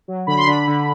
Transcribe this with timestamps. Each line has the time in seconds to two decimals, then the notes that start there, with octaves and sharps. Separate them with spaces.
0.08 F#3
0.27 D3 B5
0.37 C6
0.47 D3 B5
0.67 D3